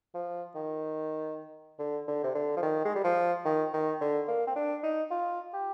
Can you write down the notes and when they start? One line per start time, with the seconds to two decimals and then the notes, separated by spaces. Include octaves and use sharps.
0.14 F3
0.55 D#3
1.79 D3
2.08 D3
2.23 C3
2.35 D3
2.56 F3
2.62 D#3
2.85 G#3
2.95 G3
3.04 F3
3.45 D#3
3.73 D#3
4.01 D3
4.28 A#3
4.47 C4
4.56 D4
4.83 D#4
5.11 F4
5.53 G4